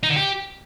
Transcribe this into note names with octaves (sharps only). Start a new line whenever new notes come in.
D#4
D3
G4